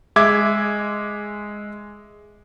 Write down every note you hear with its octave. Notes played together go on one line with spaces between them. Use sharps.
G#3 E5 D6 G#6